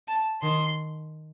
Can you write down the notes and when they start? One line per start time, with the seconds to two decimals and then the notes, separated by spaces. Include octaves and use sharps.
0.08 A5
0.42 D#3 C6